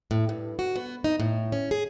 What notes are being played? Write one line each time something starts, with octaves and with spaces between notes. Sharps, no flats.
A2
G2
F#4
B3
D#4
A2
C#4
G#4